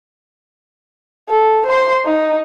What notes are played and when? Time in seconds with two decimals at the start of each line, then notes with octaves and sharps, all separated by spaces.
1.29 A4
1.66 C5 C6
2.06 D#4